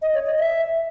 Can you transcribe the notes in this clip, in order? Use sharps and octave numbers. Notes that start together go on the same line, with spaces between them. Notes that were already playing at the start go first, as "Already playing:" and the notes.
D#5
C#5
D#5
E5